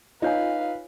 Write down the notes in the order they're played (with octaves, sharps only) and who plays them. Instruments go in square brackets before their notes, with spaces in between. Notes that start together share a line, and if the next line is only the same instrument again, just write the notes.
[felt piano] D#4 [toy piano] F4 C#5 G#5 [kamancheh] B4 F5